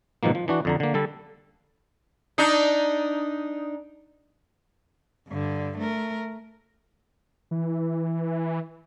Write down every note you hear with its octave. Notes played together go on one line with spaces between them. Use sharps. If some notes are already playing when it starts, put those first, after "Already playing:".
G#2 B2 D#3 F3 A#3
F3
E3 D4 F#4
F2 D3 A#5
D3 A#3
D3 G3 A4
D4 D#4
G2 D3
A3 A#4
E3